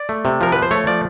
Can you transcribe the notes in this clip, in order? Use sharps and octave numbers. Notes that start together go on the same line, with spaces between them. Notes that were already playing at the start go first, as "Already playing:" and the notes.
Already playing: D5
A3
C3
F3 A#4
F3 B4
C5
A3 C#5
F3 D5